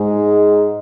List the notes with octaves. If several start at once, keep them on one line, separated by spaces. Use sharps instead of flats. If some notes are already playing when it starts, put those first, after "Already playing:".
Already playing: G#2 G#3